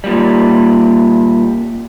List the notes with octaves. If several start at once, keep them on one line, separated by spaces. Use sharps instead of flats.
A#2 G3